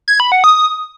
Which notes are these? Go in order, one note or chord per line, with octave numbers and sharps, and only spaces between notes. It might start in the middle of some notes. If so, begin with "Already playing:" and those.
G#6
B5
F#5
D#6